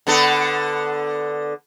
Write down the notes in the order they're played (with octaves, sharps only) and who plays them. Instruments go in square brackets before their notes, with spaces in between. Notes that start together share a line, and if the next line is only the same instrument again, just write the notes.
[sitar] D3 B3 A4